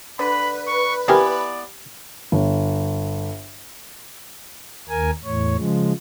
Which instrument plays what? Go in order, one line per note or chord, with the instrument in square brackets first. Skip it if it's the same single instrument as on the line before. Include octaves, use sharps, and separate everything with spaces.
[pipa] D3 [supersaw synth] B4 [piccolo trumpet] B5
[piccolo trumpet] C#6
[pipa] B3 E4 G#5 [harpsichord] C4 G4 A#4 [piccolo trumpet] D5
[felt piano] G1
[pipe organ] D#2 A#4 G#5
E2 A2 C#5
C#3 F3 G#3